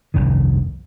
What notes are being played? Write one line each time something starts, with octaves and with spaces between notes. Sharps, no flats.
F1 C2 G2 D#3